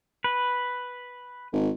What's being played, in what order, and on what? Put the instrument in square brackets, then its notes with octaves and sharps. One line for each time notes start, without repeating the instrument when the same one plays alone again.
[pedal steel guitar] B4
[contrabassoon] G#1